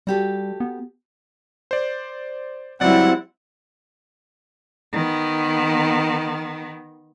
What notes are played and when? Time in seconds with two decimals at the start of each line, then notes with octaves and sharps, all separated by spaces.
0.07 G3 F#4 G4 A4
0.60 B3
1.71 C5 D5
2.81 C#2 F#3 G3 C4 E4 D5 F#5 A6
4.93 D#3 B3